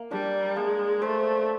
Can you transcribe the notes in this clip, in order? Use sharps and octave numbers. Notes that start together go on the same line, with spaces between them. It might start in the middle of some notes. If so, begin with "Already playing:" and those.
Already playing: A#3
G3 D4
G#3 A#3
A3 C5